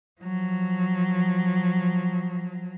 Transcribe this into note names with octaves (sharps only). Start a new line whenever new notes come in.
F3 F#3